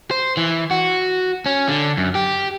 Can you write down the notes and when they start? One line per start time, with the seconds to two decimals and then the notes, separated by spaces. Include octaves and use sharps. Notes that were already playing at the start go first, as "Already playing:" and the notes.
0.11 C5
0.37 E3
0.71 F#4
1.46 C#4
1.69 D3
1.97 F#2
2.15 G4